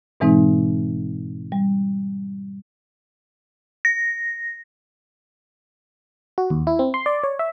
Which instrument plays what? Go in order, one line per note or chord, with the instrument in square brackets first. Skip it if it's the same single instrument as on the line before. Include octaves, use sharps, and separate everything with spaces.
[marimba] G#2 B2 E3 G#3 C4 D#4
G3
[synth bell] A#6
[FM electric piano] F#4
D#2
E4
C4
C6
D5
C#5
E5